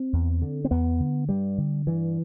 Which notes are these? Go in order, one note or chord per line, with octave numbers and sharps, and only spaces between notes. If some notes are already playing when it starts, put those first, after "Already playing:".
Already playing: C4
E2
D3
C4
E2 B3
D3
G2 G3
D3
G2 E3